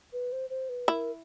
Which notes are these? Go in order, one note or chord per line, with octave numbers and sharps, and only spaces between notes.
B4
C5
C5
B4
E4 A#4